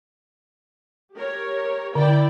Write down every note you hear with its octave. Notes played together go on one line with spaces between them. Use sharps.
G4 A#4 C#5
D3 E4 D5 G5